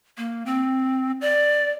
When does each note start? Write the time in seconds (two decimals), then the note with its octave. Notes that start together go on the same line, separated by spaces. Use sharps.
0.18 A#3
0.46 C4
1.21 D5